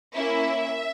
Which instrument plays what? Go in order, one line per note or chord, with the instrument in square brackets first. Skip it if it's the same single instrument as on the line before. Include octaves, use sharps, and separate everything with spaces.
[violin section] A#3 C#4 E4 E5